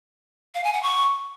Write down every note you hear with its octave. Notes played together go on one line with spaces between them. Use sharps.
F5
G#5
F#5
C#6